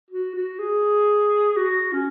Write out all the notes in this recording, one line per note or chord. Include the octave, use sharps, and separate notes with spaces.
F#4
F#4
G#4
F#4
C#4